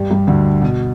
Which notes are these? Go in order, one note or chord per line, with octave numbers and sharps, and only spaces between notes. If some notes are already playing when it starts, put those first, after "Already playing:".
Already playing: G2 G3
G2 G3
D2 D3
B2